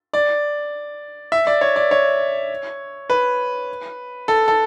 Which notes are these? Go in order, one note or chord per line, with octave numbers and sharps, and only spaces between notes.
D5
E5
D5
C#5
D5
C#5
B4
A4
A4